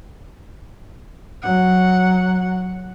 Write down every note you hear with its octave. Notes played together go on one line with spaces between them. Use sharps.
F#3 F#5